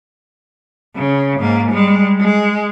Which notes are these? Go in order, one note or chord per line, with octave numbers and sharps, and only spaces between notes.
C#3
G#2 A#3
G3 G#3
G#3